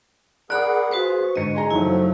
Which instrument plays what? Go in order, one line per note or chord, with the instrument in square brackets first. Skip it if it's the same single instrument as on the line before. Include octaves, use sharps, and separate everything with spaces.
[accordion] G#4 A#4 F#5 [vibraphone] D5 B5 D6 [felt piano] F#6
[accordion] F4 G#4 [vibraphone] F#4 B4 C5
[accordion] C#6
[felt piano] G#2 D3 C#7 [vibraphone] D#5
[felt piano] G#4 G#5 A#5 [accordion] C6
[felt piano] F#1 D#4 [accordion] F3 F#3 A3 [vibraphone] E4